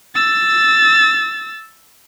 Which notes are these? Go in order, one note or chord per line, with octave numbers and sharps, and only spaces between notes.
E6 A6